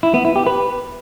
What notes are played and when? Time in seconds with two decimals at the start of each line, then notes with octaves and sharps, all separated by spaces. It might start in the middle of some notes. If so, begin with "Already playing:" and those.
0.03 E4
0.14 B3
0.25 E4
0.36 G4
0.46 B4